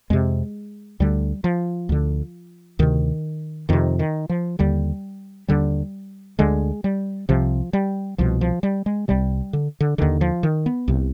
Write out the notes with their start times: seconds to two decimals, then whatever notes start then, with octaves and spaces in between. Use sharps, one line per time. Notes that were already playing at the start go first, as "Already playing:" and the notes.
0.10 F2 C3 G#3
1.00 D2 D3 G3
1.44 F3
1.89 D2 D3
2.79 D2 C3 D#3
3.69 F2 C3 D#3
3.99 D#3
4.29 F3
4.59 D#2 D3 G3
5.48 D#2 D3 G3
6.39 D2 D3 G#3
6.84 G3
7.29 C2 C3 F3
7.73 G3
8.18 C2 B2 F3
8.41 F3
8.63 G3
8.86 G#3
9.08 C2 C3 G3
9.53 D3
9.80 D3
9.98 D#2 D3 D#3
10.21 F3
10.43 D#3
10.66 B3
10.88 C2 C3